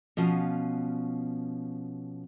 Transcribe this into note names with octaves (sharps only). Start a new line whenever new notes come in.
B2 F3 C#4 F5